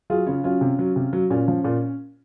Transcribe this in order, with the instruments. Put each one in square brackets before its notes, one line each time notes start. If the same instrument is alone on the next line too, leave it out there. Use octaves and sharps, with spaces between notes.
[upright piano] F#3 F4 G#4
C#3 C#4 F4
F#3 C#4 F4
C3
F#3
C3
F#3
A#2 C#4
F3
A#2